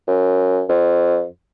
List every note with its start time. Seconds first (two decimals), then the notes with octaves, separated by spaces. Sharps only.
0.07 F#2
0.69 F2